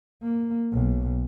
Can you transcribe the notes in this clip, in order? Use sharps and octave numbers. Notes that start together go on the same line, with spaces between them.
A#3
B1